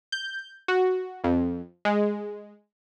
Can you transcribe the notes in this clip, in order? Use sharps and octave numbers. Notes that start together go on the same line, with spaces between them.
G6
F#4
F2
G#3